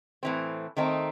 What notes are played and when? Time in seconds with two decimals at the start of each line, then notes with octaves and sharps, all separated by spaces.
0.23 A2 E3 C4
0.77 D#3 A3 C4 D#4